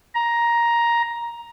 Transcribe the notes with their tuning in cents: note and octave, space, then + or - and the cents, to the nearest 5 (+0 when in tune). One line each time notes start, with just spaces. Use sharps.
A#5 +10